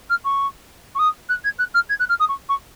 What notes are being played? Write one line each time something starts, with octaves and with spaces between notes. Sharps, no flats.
F6
C#6
C#6
D#6
F#6
G#6
F#6
F6
G#6
F#6
F6
D#6
C#6
C#6